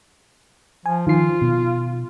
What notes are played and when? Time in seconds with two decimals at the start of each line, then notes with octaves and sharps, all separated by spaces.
0.86 F3 G#5
1.07 D#3 F3 F4 C7
1.42 B2